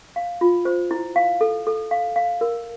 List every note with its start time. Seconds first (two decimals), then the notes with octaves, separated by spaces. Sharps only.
0.16 F5
0.41 F4
0.65 C5
0.91 E4
1.16 F5
1.41 A4
1.67 A4
1.91 F5
2.16 F5
2.41 A#4